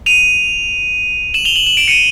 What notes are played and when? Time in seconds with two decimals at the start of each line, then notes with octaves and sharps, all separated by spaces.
0.06 D#7 F7
1.34 E7 F#7
1.45 F7 G7
1.56 E7 F#7
1.66 E7 F#7
1.77 D7 E7
1.88 C#7 D#7